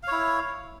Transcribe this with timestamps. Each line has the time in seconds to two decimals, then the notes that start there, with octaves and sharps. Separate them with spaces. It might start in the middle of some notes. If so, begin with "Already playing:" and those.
0.03 F5
0.07 C#5
0.12 E4